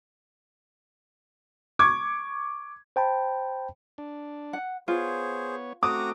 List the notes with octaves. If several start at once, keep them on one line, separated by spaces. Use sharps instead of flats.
C#6 D6 G#6
C5 G5 A5 B5
D4
F#5
B3 F4 G#4 C5 C#5
A3 C4 F#4 A#5 D6 D#6